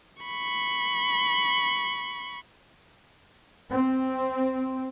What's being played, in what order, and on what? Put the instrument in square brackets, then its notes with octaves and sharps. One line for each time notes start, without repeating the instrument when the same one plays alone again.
[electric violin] B5 C#6
[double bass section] C4